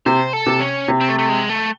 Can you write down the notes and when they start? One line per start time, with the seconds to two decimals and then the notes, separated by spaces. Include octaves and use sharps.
0.06 C3 C5
0.33 A4
0.46 C3
0.60 C#4
0.88 C3
1.01 C4
1.09 A3
1.19 A3
1.29 G#3
1.49 A3